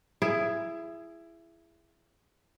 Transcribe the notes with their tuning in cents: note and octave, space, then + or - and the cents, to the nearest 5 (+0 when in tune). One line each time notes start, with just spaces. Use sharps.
E4 +20 G#4 +0